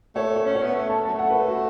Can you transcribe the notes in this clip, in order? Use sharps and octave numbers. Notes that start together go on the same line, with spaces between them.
A3 C#5
C#5
C#4
C#5
B3
A3 E5
A5
A5
F#3
A3 F#5
B4
A4
F#4